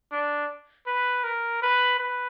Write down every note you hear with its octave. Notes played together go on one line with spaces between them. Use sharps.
D4
B4
A#4
B4
B4